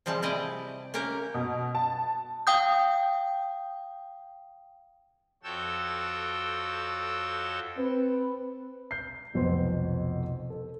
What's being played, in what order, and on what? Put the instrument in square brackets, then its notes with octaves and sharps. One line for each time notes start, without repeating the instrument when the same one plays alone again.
[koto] C3 F3 G3 G#3 A5
G3 E4 D5 D#5
A#3 C#4 G4 A#4
[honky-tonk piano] B2
A5
[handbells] F5 G5 D#6 G6
[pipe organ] F2 F#4 A4 C#5 G5 E6
[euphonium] C4 [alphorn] B4
[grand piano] G6 C7
F1 B1 F2 B3 C5
A4